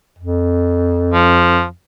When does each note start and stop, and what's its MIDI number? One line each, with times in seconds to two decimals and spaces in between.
0.18 1.70 41
1.13 1.64 53